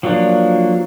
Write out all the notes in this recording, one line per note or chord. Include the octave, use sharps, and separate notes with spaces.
F3 F#3 A#3 D4